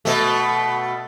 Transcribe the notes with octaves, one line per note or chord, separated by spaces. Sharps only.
B2 A3